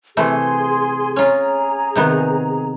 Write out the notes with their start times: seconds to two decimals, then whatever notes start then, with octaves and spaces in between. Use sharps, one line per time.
0.17 C3 E3 A3 G#4 C6
1.16 C#4 F4 G#4 A#5
1.96 C3 D#3 B3